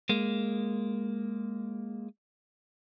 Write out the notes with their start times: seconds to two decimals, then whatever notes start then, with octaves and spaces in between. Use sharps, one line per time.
0.09 G#3 A#3